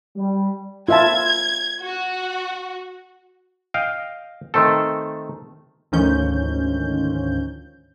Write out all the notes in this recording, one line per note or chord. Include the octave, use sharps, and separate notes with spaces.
G3
F4 E5 A5 G#6
F#4
D#5 F5 G5
D#3 A3 C4 A4
D2 G#2 D#3 F3 C#4 G6